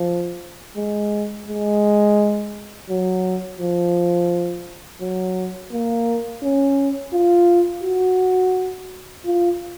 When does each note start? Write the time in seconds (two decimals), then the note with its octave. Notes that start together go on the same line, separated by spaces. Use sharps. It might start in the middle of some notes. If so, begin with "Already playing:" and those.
Already playing: F3
0.76 G#3
1.48 G#3
2.90 F#3
3.60 F3
5.01 F#3
5.72 A#3
6.43 C#4
7.14 F4
7.83 F#4
9.25 F4